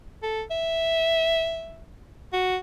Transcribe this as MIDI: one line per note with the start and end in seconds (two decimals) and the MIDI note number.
0.23 0.42 69
0.51 1.85 76
2.33 2.57 66